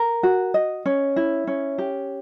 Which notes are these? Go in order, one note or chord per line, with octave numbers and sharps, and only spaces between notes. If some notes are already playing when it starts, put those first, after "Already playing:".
Already playing: A#4
F#4
D#5
C#4
E4
C#4
G4